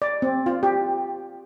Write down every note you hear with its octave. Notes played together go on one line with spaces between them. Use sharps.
D5
C4
F4
G4